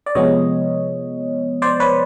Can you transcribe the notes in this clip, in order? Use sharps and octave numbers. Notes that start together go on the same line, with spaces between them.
D5
C3 F3 G#3 B3 C#5 D#5
C5 D5
B4 C#5